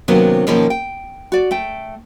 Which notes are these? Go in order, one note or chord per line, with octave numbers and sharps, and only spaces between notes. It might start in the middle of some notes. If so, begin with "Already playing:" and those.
C3 D#3 F#3 A#3 B3 C#4
B2 D#3 F3 A#3 C#4
G5
F#4 D5
A3 G5